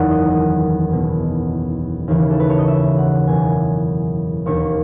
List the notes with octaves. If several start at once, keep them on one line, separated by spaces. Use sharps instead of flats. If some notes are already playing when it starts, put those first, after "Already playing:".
Already playing: F#1 E2 D#3 F#5
D#5
D#5
B1 B2
D#2 C#3 E3
A4
B4
C#5
D#5
E5
F#5
F#1 E2 B2 G#5
E1 D#2 D#3 C#6